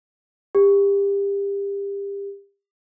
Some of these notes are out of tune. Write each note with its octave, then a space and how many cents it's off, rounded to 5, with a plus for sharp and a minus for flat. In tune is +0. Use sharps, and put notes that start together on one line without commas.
G4 +30